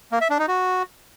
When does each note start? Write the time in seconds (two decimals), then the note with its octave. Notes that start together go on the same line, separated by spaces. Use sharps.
0.12 A#3
0.21 E5
0.30 D4
0.39 D#4
0.48 F#4